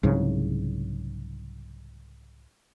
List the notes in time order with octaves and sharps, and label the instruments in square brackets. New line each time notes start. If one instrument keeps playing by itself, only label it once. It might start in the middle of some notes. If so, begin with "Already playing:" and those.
[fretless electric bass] C2 G#2 C#3 F#3